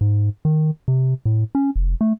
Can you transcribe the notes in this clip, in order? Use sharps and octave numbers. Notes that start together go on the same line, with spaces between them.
G#2
D#3
C3
A2
C#4
F1
A3